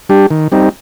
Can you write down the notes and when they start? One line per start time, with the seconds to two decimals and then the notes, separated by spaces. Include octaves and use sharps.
0.09 G3 D4 G4
0.31 D#3
0.52 G3 C4 D#4